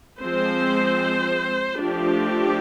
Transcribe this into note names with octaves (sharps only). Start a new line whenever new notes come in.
F3 G#3 C4 C5
F3 A3 D4 G4